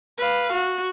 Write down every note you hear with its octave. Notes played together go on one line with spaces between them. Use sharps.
B4 F5
F#4